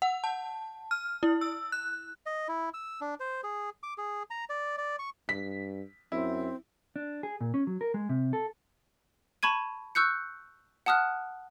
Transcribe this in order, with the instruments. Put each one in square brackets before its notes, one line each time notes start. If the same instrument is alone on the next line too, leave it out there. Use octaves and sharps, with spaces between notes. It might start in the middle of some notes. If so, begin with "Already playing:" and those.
[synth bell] F#5
A5
F6
E4
E6
F#6
[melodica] D#5
E4
E6
D4
C5
G#4
D6
G#4
A#5
D5
D5
C#6
[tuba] G2 [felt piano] B6
[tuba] F#2 [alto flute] C4 [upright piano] E4
[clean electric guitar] D4
G#4
A#2
C#4
F#3
A#4
G#3
C3
A4
[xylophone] A5 B5 C#6 G#6 D#7
C#6 E6 F#6 G6 C#7
F#5 A5 D#6 F6 F#6